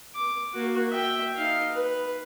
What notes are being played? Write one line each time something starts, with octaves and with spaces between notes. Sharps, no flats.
D6
A#3 F#4
E5 G5
D#4 F5
B4